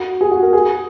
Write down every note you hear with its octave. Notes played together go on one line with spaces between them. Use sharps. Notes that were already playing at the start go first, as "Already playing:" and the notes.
Already playing: F#4
G#4
F#4
A#4
G#4